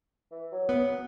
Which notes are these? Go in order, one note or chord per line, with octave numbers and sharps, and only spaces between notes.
E3
F#3
B3